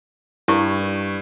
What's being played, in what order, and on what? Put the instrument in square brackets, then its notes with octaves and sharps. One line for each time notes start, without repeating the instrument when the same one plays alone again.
[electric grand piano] G2 [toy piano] E4 C#6